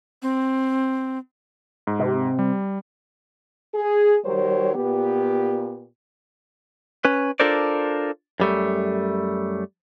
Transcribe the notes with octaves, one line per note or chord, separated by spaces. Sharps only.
C4
G#2
C3
G3
G#4
D#3 F#3 G3 A#4 C5 C#5
A#2 B3 G4
C#4 B4
D4 F4 A4 A#4 C5 D5
F#2 G3 A3